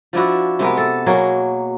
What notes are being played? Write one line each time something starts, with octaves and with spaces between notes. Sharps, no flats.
F3 D4 E4 F#4
C3 G#3 B3 A#4
A4
B2 F#3 A#3 G#4